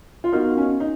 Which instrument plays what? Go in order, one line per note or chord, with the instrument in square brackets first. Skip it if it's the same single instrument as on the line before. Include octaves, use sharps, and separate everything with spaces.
[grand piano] F4
[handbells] B3 F#4 A#4 F5 [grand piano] D#4
[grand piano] C#4
D#4